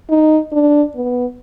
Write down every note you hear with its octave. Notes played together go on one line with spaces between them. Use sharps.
D#4
D4
B3